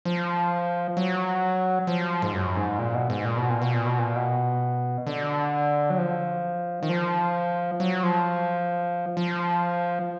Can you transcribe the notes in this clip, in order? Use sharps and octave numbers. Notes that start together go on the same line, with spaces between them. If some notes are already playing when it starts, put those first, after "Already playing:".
F3
F#3
F3
G#2
F#2
G#2
A#2
B2
G#2
A#2
B2
A#2
B2
A#2
B2
A#2
B2
D3
F#3
F3
D#3
F3
F#3
F3
F3